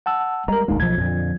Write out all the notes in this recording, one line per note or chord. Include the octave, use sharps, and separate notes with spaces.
F#5 A5 E6
G3 G#3 A#4 A#5
D#1 D2 G#3 A#3 D#4
B1 F3 G#6
F2 A#2 D3